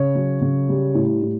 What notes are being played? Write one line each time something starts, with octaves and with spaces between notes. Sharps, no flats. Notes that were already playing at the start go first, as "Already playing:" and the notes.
Already playing: C#3 C#5
F#3
C#3
G3
A2
A2